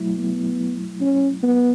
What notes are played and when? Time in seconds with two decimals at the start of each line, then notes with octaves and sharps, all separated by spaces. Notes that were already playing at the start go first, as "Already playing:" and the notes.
Already playing: F#3 A3 E4
0.17 B3
1.01 C#4
1.43 B3